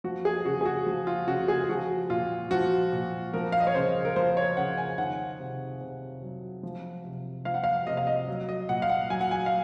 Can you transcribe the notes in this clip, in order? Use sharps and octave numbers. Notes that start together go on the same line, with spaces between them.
F3 F#4
G#4
C#3 F#4
G#4
F#4
F3
F4
C#3 F#4
G#4
F3 F#4
A#2 F4
F3 F#4
A#2
F3 A#4
F5
D#5
C#5
C#3 C5
A#4
F3 C5
C#5
C#3 F#5
G#5
D#3 F#5
C3
C3
F#3
F3
C3
F3 F5
F#5
F5
C3 D#5
F5
D#5
F#3
D#5
A#2 F#5
F5
F#5
F#3 G#5
F#5
G#5
F5